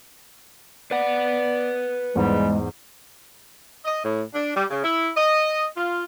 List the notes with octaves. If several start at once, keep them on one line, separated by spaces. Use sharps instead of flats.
B4 D5 F#5
E2 G#2 G3 G#3
D#5
A2
D4
G3
C#3
E4
D#5
F4